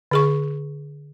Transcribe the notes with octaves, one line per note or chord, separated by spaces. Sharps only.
D3 G#4 C#6